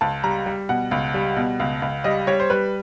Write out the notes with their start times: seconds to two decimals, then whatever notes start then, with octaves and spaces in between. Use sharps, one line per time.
0.01 C#2 A5
0.24 G3 A#5
0.46 G3
0.69 B2 F#5
0.91 C#2
1.14 G3
1.37 B2
1.60 C#2
1.82 C#2
2.04 G3 D#5
2.27 G3 C#5
2.40 C5
2.50 G3 B4